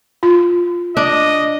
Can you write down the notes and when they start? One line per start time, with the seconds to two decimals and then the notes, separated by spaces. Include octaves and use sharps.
0.23 F4
0.97 D4 D#5